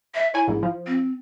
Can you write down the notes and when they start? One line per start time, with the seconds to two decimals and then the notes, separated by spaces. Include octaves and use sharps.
0.14 E5
0.34 E4 C#5 G#5
0.48 A#1 G#2
0.63 F3
0.87 C4